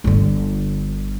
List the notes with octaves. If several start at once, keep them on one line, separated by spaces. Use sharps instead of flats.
G1 D3